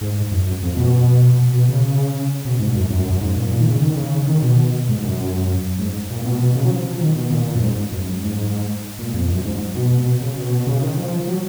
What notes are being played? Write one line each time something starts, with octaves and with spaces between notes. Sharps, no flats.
G#2
F#2
F2
B2
B2
C#3
B2
G#2
F#2
F#2
F#2
G#2
A#2
D#3
C#3
D#3
C#3
D#3
B2
G#2
F#2
G#2
A#2
B2
B2
C#3
F#3
F3
D#3
B2
A#2
F#2
G#2
F#2
G#2
A#2
F2
F#2
G#2
B2
B2
C#3
B2
C#3
D#3
F3
F#3